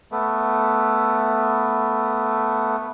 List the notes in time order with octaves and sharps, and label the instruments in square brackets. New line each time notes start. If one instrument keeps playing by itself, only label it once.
[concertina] A3 B3